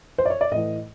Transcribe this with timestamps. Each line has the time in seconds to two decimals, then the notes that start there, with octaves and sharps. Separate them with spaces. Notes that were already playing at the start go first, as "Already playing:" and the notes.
0.18 C5
0.26 D5
0.30 C#5
0.41 D5
0.51 A2 E3 D#5